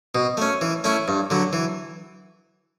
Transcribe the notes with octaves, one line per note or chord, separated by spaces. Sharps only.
B2
A3 C#4
E3
A3 C#4 E4
G2
D3 F#3
E3